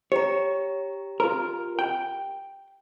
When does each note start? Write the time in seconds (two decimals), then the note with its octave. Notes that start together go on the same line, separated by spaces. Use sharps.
0.12 G4 C#5 A#5
1.20 F4 A#4
1.79 G5